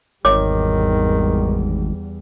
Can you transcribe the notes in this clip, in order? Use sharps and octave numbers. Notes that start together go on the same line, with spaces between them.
G#1 E2 D#3 G3 C#5 D6